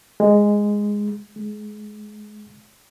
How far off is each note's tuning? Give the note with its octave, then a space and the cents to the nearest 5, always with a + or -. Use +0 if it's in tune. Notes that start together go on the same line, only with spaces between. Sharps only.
G#3 -5
G#3 +25